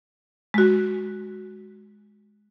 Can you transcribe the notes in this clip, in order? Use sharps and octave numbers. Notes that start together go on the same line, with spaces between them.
G#3 F#4